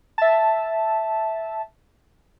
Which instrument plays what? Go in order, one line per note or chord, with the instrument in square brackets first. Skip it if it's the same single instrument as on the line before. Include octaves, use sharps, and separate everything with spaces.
[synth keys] E5 A5